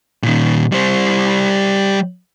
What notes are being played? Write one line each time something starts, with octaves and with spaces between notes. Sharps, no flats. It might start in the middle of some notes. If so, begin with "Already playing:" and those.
A#2 D#3
G3 C5